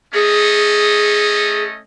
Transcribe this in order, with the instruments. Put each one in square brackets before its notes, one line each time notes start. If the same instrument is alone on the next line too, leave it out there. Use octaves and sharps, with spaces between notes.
[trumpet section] A3 C#4 D#5 [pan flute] G#4